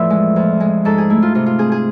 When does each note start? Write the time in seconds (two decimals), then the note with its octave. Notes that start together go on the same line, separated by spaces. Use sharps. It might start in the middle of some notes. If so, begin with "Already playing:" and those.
Already playing: E2 A2 F3 D5 E5
0.10 G#3
0.36 F2
0.60 G#3
0.85 G#2 A4
0.98 G#4
1.10 A3 E4
1.22 F4
1.35 C3 F4
1.46 F4
1.59 C4 G#4
1.72 G#4